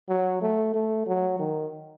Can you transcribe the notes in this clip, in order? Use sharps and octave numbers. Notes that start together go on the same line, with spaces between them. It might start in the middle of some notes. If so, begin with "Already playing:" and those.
F#3
A3
A3
F#3
D#3